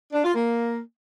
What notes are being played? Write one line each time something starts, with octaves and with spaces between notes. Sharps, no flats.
D4
F4
A#3